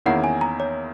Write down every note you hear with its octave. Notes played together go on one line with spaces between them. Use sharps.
E2 D#3 A#3 C#4 E4 F#5
G#5
A#5
C#5